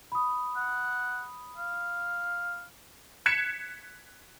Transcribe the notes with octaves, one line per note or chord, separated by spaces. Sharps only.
B5 D#6
F#5
F5
F#6 G#6 B6 C#7 E7